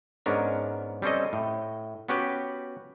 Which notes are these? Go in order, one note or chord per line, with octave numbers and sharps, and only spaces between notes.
G#2 B3 C#4 D4 A#4
G3 C4 C#4 A4 D#5
A2
B3 C#4 F#4 G4 B4